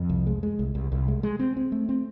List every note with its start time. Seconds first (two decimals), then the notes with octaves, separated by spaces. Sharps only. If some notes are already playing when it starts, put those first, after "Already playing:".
Already playing: F2
0.09 C2
0.27 G#3
0.43 G#3
0.59 C2
0.75 C2
0.92 C2
1.08 G#3
1.23 G#3
1.39 C4
1.57 C4
1.72 A3
1.89 C4